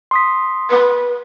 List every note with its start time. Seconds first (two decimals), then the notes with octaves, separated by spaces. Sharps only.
0.11 C6 D#6 B6
0.70 B4